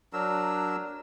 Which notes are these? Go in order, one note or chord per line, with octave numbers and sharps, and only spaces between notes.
F#3 D4 A#4 E6